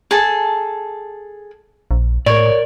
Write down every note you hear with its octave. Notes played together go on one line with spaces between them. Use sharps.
G#4 A4 A5
A#1
A2 A#4 C#5 D5